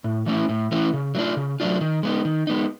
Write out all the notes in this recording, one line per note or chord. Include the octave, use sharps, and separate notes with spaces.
A2
E3 A3 C#4 E4
A2
E3 A3 C#4 E4
C#3
F#3 A3 D4 F4
C#3
F#3 A3 D4 F4
D#3
G#3 B3 D#4
D#3
G#3 B3 D#4